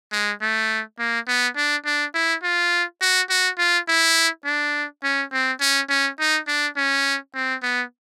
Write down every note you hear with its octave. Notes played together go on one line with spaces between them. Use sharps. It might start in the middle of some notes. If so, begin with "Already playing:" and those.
G#3
A3
A#3
B3
D4
D4
E4
F4
F#4
F#4
F4
E4
D4
C#4
C4
C#4
C#4
D#4
D4
C#4
C4
B3